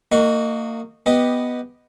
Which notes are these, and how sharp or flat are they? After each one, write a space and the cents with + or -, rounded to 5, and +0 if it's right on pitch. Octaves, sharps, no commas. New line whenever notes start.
A#3 -35 D#4 -15 F#4 -10
B3 +0 G4 +0 D#5 +0